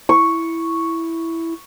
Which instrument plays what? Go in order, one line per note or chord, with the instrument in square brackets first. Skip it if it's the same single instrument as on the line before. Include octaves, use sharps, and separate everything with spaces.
[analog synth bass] E4 [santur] C#6